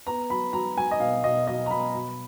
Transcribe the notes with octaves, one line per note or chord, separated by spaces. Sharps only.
B3 A#5
F#3 B5
F#3 A#5
F#3 G#5
D#5
B2 F5
B2 D#5
F#3 D#5
A#5
B2 B5
F#3